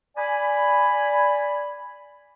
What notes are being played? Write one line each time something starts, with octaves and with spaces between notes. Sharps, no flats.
D5 G#5 B5